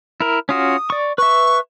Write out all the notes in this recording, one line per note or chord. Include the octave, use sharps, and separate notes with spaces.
E4 A#4
C#4 F4 F#4 D#6
D5 C#6
B4 E5 C#6